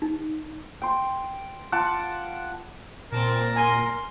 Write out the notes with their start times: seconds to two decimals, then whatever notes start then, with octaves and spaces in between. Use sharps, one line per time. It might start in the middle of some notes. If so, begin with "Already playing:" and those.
0.02 D#4
0.82 G5 C6
1.72 F4 F#5 A5 D6
3.12 A#2 C4 A#4 A5
3.56 G#5 C6